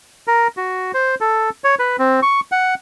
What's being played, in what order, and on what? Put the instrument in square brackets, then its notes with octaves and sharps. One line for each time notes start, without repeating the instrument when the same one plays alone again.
[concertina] A#4
F#4
C5
A4
C#5
B4
C4
C#6
F#5